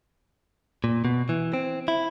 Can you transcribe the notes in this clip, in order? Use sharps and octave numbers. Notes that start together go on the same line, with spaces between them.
A#2
B2
E3
C4
E4